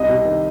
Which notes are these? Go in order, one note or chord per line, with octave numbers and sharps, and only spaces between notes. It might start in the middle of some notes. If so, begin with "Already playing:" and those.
Already playing: C2 D#5
C3
D#3